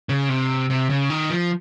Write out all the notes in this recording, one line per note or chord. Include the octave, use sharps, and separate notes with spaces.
C#3
C3
C3
C#3
D#3
F3